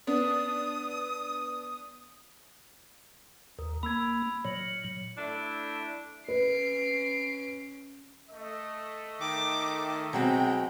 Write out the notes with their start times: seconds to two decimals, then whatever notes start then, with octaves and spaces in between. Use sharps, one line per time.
0.07 B3 D4 D#6
3.59 D#2 A#4
3.83 A#3 B5 E6 G#6
4.45 A#2 F#3 C#5
5.18 A3 D4 E4
6.28 C#4 B4 C7 D7
8.31 A3 D#5
9.21 D#3 D6
10.13 B2 F#3 G#3 C4 G5